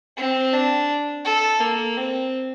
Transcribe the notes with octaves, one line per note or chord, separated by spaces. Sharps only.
C4
D4
A4
A#3
C4